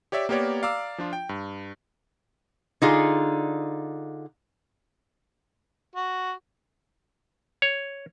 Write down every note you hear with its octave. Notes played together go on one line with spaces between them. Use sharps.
G4 C#5 D5 E5
A#3 B3 G4 A#4 C#5 D5
D5 F5 A#5 D6 E6
F3 D4 F4
G5
G2
D3 D#4 F4 G#4
F#4
C#5